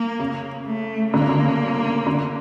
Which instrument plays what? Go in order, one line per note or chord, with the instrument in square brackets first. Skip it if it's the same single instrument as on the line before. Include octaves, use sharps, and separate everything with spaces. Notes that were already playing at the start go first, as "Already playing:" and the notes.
Already playing: [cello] A#3
[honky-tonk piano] C#3
[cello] A3
[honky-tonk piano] D3 [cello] A#3
[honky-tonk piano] C#3
D3
C#3
D3